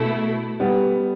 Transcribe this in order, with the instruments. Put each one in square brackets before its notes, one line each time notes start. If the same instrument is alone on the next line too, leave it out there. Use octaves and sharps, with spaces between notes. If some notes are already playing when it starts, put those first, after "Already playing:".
Already playing: [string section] B2 A3 E4
[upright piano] G3 B3